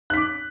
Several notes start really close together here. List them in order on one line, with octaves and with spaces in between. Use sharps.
F#6 B6 D6